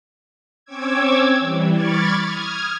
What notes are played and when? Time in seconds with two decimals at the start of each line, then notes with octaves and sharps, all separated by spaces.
0.65 C4 C#4 C#5 D6 E6 G#6
1.39 E3 G3
1.73 B5 C#6 D6 F6 G#6 A6
2.24 D#6 F6 G#6